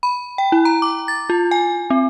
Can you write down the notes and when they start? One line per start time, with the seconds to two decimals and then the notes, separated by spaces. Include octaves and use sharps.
0.03 B5
0.38 G5
0.52 E4
0.65 A#5
0.82 D6
1.08 A6
1.30 F4
1.51 G#5
1.90 C4